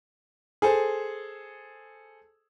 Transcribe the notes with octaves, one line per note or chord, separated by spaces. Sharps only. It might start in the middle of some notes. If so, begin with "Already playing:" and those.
G#4 A4 C5